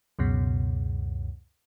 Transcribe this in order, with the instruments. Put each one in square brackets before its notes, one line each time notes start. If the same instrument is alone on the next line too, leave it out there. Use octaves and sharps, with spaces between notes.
[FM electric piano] C#2 F#2 B2